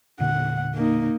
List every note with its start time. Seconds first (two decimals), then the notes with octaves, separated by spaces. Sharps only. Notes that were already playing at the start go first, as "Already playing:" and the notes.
0.20 E1 A#2 D3 F#5
0.74 A#3 D#4